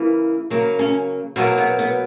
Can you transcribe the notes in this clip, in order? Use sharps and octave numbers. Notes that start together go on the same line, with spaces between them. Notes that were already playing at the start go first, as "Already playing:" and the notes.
Already playing: C#3 E3 A#3
C#3 F#3 A#3
C#4
B2 F#3 A#3 B3
B3
B3